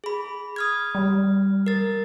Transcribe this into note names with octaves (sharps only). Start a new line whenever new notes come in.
G#4 B5
D#6 F6 G#6
G3
A#4 A6